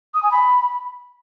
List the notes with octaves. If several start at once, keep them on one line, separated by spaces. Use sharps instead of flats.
D#6
G#5
B5